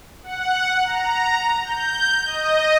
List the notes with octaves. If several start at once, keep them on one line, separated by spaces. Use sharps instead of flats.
F#5
A#5
G6
D#5